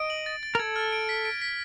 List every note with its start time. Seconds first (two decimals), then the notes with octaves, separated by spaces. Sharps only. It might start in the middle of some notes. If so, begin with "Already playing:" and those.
Already playing: D#5 D7
0.10 F#7
0.26 A6
0.43 A6
0.55 A#4
0.59 A4 G#6
0.76 F6
0.92 D7
1.09 B6
1.25 D7
1.42 B6